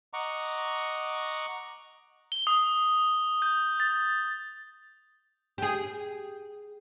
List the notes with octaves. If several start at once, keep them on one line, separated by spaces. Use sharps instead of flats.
D#5 F#5 A#5 C#6 D6
G7
D#6
G6
A6
G4 G#4